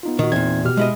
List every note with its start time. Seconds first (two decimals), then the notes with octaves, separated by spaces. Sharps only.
0.03 B3 D#4 F4
0.19 A#2 D#3 F#4
0.32 E2 A#2 C4 D#4 G#6
0.64 B2 G4 F6
0.77 G#3 E4 D#5